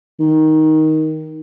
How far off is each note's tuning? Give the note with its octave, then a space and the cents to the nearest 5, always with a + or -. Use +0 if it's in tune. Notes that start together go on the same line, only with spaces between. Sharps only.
D#3 +10